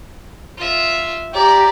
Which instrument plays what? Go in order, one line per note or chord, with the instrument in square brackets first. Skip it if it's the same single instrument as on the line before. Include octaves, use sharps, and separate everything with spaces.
[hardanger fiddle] F4 E5
[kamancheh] G4 A#5 [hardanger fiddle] D5